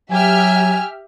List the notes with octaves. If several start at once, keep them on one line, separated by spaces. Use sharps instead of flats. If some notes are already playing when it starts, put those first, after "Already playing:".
F#3 G4 E5 G#5 F6